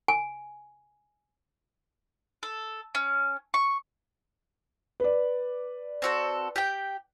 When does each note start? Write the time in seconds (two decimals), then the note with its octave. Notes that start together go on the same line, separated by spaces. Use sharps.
0.08 G#5
2.43 A4
2.95 C#4
3.54 C#6
5.00 B4 D5
6.02 C4 F#4 A4
6.56 G4 G5